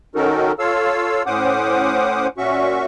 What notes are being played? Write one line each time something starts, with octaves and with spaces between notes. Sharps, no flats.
D#3 C#4 D#4 F#4 A4 A#4
F4 A4 C#5 F5 E6
A2 C#4 C5 F#5 D6 D#6
A#2 C#4 F#4 E5 C#6